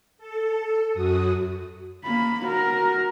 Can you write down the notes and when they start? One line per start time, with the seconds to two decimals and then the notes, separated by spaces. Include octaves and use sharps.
0.18 A4
0.93 F#2 F#4 D#6
2.04 A#3 B5
2.45 F#4 A#4